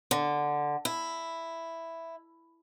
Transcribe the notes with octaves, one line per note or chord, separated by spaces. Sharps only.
D3
E4